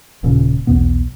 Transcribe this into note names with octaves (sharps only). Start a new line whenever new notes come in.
D#1 D#2 A#2 C#3
B1 E2 B2 B3